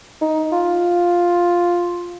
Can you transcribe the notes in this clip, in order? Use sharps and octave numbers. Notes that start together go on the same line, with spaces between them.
D#4
F4